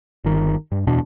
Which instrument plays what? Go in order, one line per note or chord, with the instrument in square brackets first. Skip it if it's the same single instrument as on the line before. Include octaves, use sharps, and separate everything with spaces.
[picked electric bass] G1 D#3
G2
D1 E2 B2 D4